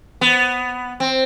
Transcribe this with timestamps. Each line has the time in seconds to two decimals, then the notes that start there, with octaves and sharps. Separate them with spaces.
0.21 B3
1.00 C4